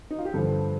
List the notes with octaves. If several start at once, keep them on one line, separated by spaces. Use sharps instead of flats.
D#4
F4
G4
G2 D3 F3 A4